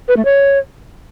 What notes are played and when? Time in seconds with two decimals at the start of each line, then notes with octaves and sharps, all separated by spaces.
0.08 B4
0.17 A3
0.25 C#5